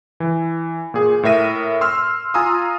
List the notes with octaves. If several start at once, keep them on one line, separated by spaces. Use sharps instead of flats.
E3
A#2 G#4
A2 A#4 E5 A#6 D#7
C6 E6 F6
F4 G#5 A#5 C6 D#6 E6